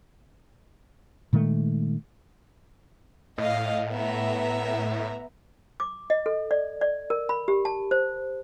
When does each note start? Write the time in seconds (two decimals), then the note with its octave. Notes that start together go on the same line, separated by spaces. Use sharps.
1.33 A#2 D#3 G#3 A3
3.38 A2 D#5 F5
3.93 B3 E5 A#5
5.80 D6
6.10 D#5
6.26 A4
6.51 D5
6.81 D5
7.10 A#4
7.29 B5
7.48 G4
7.65 A5
7.91 C5